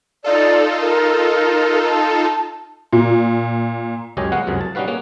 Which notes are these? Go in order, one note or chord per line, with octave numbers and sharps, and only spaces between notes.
D#4 F4 A4 D5
A#4
A5
A#2
C#2 F#2 C#4 G4 D#5 G#5
G#3 B3 F#4 F5 F#5
C#2 F#2 C3 G#4
A5
G3 C#4 D#4 F#4 B4 F5
A#3 C#4 G#4 C#5